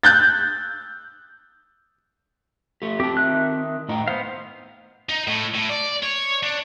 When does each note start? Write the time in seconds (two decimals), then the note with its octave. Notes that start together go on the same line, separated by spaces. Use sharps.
0.03 F#6 G6 A6
2.82 A3 G4
3.00 C4 G4 A5
3.17 D#3 E5 F#6
3.89 A2 D#4 G5
4.08 B3 C5 F5
5.09 D#4
5.27 A2
5.54 A2
5.69 D5
6.03 C#5
6.43 D4